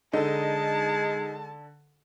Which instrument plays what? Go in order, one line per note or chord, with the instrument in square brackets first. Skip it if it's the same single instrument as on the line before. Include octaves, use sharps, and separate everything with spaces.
[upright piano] D3 A4 [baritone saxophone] G#3 [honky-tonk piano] D#4 [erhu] A5